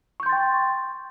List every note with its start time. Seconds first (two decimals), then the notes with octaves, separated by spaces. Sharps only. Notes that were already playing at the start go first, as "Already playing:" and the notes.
0.20 C#6
0.23 G6
0.26 C6
0.29 A6
0.32 G5